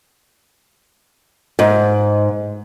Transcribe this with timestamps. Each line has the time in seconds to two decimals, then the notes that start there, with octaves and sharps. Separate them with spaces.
1.59 G#2